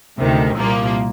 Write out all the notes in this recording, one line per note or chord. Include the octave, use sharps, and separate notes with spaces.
D2 C3 D#3
C2 A#2 F3 A#3